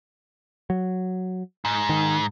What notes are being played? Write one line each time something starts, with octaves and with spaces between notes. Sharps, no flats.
F#3
G#2
D#3